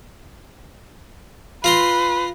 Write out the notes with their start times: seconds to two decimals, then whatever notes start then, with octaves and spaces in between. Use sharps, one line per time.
1.64 F4 B4 A#5 C6